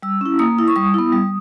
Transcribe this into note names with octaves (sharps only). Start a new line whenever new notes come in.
G3 E6
C#4 E4
A#3 D#6
E4
C#6
G3 D#6
B3 E4
G3